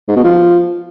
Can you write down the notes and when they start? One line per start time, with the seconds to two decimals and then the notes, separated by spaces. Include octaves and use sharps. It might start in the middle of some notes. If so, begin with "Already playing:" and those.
0.08 G#2
0.16 B2
0.24 F3